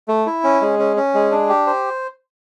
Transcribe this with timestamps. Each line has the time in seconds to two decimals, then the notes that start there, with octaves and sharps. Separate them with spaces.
0.08 A3
0.26 E4
0.44 C#4
0.61 G#3
0.79 C#4
0.97 C#4
1.14 G#3
1.31 D4
1.49 G4
1.67 C5